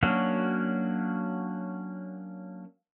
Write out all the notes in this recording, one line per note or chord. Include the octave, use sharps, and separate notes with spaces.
F#3 A#3 C#4 D4 F#4